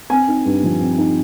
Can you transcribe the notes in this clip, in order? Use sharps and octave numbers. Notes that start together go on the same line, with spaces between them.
C4 G#5
D#4
G2
F3
C4
D#4